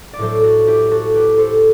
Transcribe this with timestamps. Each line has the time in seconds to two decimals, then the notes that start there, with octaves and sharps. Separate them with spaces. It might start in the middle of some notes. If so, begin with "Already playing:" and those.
0.13 D5
0.19 A2 F#3 A3 A4 C5
0.44 F#4 A4
0.68 E4 G4
0.91 F#4 A4
1.15 G4 B4
1.38 A4 C5